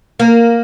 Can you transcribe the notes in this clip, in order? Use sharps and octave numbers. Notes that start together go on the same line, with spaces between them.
A#3